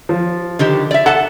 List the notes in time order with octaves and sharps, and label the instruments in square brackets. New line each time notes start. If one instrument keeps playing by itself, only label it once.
[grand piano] F3
[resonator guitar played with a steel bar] D3 D#3 G4
D5 E5
[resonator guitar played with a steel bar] A4 A5 [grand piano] F#5